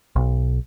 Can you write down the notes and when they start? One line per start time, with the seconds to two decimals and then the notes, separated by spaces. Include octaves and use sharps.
0.16 B1